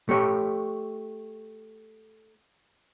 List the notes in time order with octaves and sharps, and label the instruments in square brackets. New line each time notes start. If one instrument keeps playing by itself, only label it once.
[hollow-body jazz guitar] A3 G4 C#5